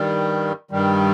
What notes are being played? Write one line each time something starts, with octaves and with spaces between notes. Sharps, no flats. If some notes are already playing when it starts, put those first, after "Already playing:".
Already playing: G2 D#3 G3
G2 D#3 G3